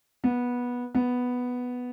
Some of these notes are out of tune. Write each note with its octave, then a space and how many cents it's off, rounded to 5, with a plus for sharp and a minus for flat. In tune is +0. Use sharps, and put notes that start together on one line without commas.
B3 -15
B3 +0